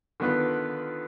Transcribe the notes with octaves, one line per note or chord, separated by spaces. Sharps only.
D3 D#3 B3 F4 B4